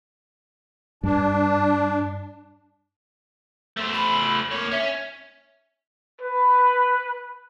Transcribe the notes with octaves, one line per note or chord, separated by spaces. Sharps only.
G2 D4
A3 C5
B5
A#3 C#5
C#4 E5
B4